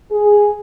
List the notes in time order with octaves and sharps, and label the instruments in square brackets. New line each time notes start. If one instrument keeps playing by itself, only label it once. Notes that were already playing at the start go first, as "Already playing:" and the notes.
[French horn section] G#4